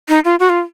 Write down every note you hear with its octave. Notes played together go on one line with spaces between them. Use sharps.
D#4
F4
F#4
F4